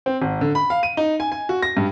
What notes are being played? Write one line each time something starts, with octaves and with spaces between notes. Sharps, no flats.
C4
G#1
D3
B5
F5
D#7
D#4
G#5
G#5
F#4
A#6
G2